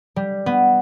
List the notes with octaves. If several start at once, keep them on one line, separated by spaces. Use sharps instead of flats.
G3
B3